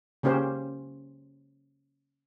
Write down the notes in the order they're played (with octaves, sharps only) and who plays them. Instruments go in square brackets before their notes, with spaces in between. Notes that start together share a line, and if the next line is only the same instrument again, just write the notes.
[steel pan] C#3 A#3 C#4 G4 C5